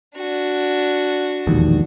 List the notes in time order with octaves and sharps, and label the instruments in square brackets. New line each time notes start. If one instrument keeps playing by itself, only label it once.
[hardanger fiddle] D4 F#4
[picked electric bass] E1 A#1 D#2